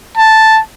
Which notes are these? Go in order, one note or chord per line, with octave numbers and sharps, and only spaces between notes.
A5